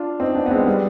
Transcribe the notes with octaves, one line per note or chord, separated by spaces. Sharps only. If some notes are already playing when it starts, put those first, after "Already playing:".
Already playing: D4 F4
C4 D#4
B3 D4
B3
G#3 C4
G3 B3